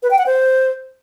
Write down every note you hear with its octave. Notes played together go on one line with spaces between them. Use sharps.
B4
G5
F#5
C5